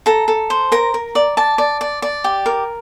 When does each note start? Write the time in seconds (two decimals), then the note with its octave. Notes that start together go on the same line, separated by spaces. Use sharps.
0.06 A4 A#5
0.28 A4
0.50 C5
0.72 A#4 A#5
0.94 A#4
1.15 D5
1.37 D5 A5
1.58 D5
1.81 D5
2.02 D5
2.24 G4
2.46 A#4